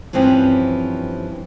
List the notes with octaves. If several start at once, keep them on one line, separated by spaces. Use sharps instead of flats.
G2 E3 F3 C4 C#4